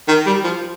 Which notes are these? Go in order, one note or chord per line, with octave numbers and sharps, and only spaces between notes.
D#3
G3
F3